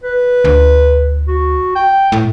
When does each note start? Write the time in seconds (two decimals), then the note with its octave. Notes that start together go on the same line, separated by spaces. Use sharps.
0.03 B4
0.44 D2
1.27 F#4
1.75 G5
2.12 A2